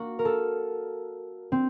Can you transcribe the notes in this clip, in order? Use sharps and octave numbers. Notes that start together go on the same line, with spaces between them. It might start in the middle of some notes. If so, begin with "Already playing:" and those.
Already playing: A#3 F#4
A#4
A4
C4